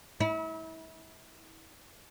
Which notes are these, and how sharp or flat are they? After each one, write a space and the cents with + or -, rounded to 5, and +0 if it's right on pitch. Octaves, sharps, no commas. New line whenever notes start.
E4 -35